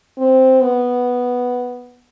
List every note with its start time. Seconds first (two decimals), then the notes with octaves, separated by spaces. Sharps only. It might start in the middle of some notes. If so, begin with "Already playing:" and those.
0.18 C4
0.61 B3